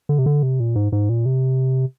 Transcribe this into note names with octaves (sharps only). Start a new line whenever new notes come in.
D3
C3
D3
C3
A#2
G#2
G#2
A#2
C3